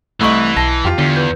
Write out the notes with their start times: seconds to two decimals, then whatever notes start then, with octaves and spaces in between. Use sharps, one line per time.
0.21 C2 E3 A3 D#5 C#6 G6 F#7
0.57 B1 A5 A#6 C7 G7
0.85 F2 F4 G4
0.99 E2 D3 G7
1.16 B4 G6